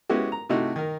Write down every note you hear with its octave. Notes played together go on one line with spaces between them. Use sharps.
G#3 B3 C#4 E4 F#4 G4
A#5
C3 A3 D#4 E4 F#4
D#3 A#4